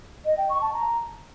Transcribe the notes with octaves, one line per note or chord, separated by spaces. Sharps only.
D#5
G5
C#6
A5
A#5